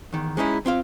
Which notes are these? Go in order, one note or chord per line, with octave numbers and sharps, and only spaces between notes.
E2 D#3
G#3 C#4 D#4 E4
C4 F4 F5